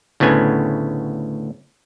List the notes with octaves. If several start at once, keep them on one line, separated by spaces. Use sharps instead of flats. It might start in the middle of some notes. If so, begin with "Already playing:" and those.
D2 A2 C#3 B3 G#5